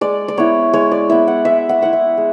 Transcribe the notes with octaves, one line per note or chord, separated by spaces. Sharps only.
G#3 D5
D5
B3 E4 C#5
G#3 C#5
D5
B3 E4 E5
F#5
G#3 E5
F#5
B3 E4 F#5
E5
G#3